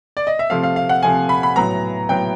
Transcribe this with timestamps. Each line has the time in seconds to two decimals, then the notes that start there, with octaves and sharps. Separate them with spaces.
0.17 D5
0.27 D#5
0.39 E5
0.50 C3 F3 A3 F5
0.63 F5
0.76 F5
0.89 F#5
1.03 C3 F3 A3 G#5
1.29 B5
1.43 B5
1.56 A2 F#3 B3 A#5
2.09 A2 F#3 B3 G5